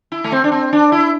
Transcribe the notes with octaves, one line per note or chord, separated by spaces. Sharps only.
E4
A3
C4
D4
C4
D4
E4